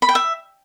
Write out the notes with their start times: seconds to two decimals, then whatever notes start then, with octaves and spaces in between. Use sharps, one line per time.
0.02 B5
0.09 G5
0.15 E5